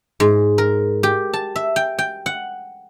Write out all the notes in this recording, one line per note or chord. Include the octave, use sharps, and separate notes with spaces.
G#2
A#4
G4
A5
E5
G5
G5
F#5